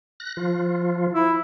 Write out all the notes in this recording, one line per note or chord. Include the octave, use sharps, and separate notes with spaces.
F#6 A#6
F3 F4
E4